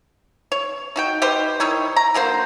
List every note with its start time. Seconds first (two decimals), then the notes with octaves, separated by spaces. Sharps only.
0.52 C#5
0.96 D#4 F#4 G5
1.22 D#4 G4 B4 C5
1.60 D#3 D#4 E4 C#5
1.96 A#5
2.14 D3 F#3 A#3 C5